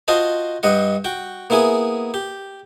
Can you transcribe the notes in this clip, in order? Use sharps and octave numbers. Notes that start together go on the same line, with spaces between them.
F4 F#4 C5 D#5 A5
G2 G3 D#5 F#5
F#4 G5
A#3 B3 E4 G#4 G#5
G4